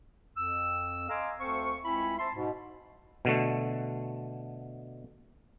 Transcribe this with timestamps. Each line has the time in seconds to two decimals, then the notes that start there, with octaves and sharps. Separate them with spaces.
0.36 F2 E6
1.09 D#5 F5 G#5 A#5 C6 D6
1.40 D2 C4 A4 C5 F5 C#6
1.84 C#2 C4 E4 E5 G#5 B5
2.18 C5 E5 A5 C6
2.35 G#2 B2
3.25 B2 D3 A3